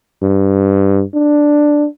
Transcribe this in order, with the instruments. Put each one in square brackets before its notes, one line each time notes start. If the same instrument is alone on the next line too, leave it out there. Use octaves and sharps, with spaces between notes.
[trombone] G2
D4